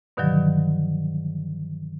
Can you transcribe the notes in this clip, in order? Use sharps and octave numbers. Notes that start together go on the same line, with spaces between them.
G2 B2 D3 D#3 F3 F#3